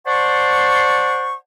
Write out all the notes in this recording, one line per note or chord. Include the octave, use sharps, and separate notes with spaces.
C5 D5 F#5 A5 C6 C#6